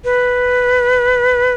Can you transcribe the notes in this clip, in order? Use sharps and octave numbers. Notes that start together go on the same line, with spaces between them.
B4